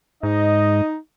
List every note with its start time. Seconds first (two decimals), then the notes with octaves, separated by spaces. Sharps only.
0.23 G#2 D#4 D#5